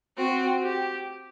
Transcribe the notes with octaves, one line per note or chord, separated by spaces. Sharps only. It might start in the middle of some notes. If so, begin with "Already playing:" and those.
C4 F#4
G4